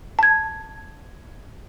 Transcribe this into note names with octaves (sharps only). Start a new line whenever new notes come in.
A5 G#6